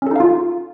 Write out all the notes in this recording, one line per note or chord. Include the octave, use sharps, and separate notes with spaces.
C#4 D#4 F4 A4 F5